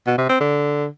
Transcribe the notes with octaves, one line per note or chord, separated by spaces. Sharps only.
B2
C3
C4
D3